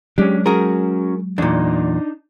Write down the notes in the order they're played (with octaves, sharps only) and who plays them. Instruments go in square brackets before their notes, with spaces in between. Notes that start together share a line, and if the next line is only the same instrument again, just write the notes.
[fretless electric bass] F#3 G#3 [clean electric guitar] C#4 D4 [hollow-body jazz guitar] G4
[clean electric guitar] C#4 F#4 F#5 [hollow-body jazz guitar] G#4 A#4
[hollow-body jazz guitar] E2 A#2 [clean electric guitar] D4 D#4